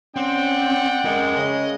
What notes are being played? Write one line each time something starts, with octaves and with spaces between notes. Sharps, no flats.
C4 C#4 D5 F#5 G5
G#3 C#4 A#4
C#3 D#5